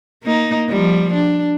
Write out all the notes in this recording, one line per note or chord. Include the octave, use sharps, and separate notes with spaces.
A#3 D#4
F3 G3
D4